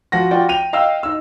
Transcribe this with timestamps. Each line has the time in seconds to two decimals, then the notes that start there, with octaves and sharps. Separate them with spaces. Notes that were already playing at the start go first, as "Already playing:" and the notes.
0.12 F3 F#4 A#6
0.31 F4 F#4 D5 G5
0.49 G5 D#7 F7
0.73 D#5 F5 G5 E6
1.03 D#4 E6